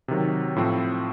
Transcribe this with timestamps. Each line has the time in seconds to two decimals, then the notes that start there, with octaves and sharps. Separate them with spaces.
0.08 C3 D#3 F#3
0.56 A2 F3 A3 C4